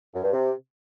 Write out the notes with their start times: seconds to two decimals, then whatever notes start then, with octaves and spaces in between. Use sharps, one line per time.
0.14 F#2
0.23 G2
0.32 C3